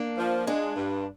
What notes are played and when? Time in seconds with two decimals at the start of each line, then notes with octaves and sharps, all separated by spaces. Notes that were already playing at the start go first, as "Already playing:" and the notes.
Already playing: A#3 D4
0.18 F3
0.47 G#3 D4 F4
0.76 G2